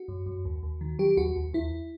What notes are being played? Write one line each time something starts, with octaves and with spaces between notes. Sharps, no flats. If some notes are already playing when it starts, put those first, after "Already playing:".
Already playing: F#4
F#2
F#2
D#2
D#2
D#3
F#3 G4
D#2 F#4
D#2
E2 E4